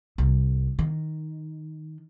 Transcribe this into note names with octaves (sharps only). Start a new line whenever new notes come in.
C2
D#3